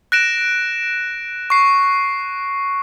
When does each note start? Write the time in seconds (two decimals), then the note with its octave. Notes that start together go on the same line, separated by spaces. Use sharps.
0.12 F#6 A#6 D7 E7
1.50 C#6 C7